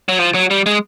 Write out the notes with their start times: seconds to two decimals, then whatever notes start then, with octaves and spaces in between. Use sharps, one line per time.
0.09 F#3
0.19 F3
0.34 F#3
0.50 G3
0.66 G#3